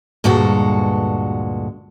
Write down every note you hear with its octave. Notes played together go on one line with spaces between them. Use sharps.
D2 G2 A#2 G#3 F#4 A4